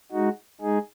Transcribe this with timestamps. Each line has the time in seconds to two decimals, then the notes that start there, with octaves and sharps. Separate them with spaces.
0.12 G#3 D#4 F#4
0.61 G#3 D#4 G#4